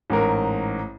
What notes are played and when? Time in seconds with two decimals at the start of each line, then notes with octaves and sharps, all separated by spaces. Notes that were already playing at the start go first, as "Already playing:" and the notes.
0.10 A1 G#2 A#4